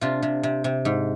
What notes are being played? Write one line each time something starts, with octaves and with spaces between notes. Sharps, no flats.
C3 D4 F4
C3
C3
C3
G#2